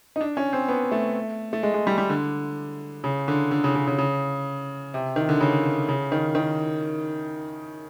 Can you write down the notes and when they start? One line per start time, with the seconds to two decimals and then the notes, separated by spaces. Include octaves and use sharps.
0.16 D#4
0.21 D4
0.37 C#4
0.53 C4
0.69 B3
0.92 A3
1.53 A3
1.63 G#3
1.74 G#3
1.87 G3
1.98 G3
2.09 D3
3.04 C#3
3.28 D3
3.51 D3
3.64 C#3
3.75 C#3
3.87 C#3
3.98 C#3
4.94 C3
5.16 D#3
5.29 D3
5.41 C#3
5.89 C#3
6.12 D#3
6.35 D#3